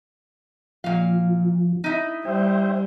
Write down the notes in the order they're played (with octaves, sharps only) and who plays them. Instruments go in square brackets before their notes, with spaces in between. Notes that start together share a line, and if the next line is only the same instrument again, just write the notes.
[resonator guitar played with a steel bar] A#2 F5 [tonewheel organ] F3
[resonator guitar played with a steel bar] D#4 E4
[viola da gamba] G3 [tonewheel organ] C5 E5 G5